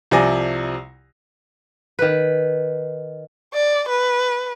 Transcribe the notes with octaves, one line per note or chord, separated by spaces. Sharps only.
C2 C3 F3 D5 G#5 A#6
D#3 B4
D5
B4